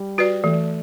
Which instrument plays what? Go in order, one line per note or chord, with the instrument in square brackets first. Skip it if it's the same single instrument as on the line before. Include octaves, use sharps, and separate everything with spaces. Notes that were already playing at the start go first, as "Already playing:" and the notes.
Already playing: [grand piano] G3
[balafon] F#4 B4 D5
[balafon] E3 [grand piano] A3